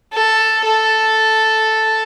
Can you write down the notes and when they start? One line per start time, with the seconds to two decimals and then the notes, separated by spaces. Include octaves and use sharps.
0.13 A4
0.65 A4